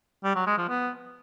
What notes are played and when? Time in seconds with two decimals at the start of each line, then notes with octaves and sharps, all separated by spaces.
0.24 G3
0.35 F#3
0.47 G#3
0.58 F3
0.69 B3